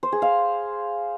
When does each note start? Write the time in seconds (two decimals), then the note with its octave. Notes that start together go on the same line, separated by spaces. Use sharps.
0.03 C5
0.12 G#4
0.22 F5